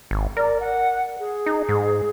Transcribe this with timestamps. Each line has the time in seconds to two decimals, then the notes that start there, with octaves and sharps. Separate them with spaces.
0.11 G#1
0.37 A#4 D5
0.60 F#5
1.19 G#4
1.46 D#4
1.69 G#2